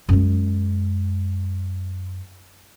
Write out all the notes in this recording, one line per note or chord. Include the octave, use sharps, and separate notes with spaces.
F#2 G#3